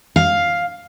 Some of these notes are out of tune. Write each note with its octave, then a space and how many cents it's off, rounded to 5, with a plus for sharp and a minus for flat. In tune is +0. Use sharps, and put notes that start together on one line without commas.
F5 +5